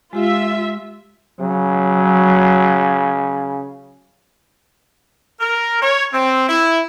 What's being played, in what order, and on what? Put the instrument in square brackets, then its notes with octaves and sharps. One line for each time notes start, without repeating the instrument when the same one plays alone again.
[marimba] G#3 G4 F5 [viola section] F4 E5
[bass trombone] C#3 [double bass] F#3
[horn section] A#4
C#5
C4
E4